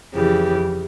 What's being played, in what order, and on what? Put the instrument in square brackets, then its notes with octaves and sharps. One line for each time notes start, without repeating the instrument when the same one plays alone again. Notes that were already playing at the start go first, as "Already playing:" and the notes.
[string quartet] F2 C#3 E3 G4